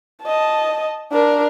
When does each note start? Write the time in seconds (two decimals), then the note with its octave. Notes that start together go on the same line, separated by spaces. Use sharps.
0.23 D#5 A5
1.12 D4 A#4